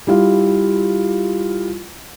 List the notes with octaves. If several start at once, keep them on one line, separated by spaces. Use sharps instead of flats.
G3 E4 F4